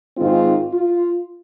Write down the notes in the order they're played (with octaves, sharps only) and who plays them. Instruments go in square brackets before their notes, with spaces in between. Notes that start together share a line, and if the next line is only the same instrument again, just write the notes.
[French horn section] G#2 D#3 G#3 C4 F4
F4